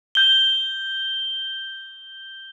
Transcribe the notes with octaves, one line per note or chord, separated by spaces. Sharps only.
G6 G7